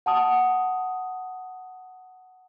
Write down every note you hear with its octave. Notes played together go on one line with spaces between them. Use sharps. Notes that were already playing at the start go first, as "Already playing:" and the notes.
F#5 A5 D#6